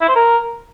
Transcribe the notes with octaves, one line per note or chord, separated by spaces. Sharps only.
E4
C5
A#4